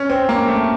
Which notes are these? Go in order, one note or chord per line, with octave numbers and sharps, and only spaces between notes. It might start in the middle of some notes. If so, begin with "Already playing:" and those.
Already playing: C#4
C4
A#3
A3